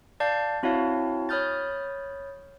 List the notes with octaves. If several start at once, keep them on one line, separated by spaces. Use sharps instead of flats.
D5 F5 A5 G6 C7
C4 E4 F#4 C#5 F5 A5
C#5 B5 D#6 F6 G6 A6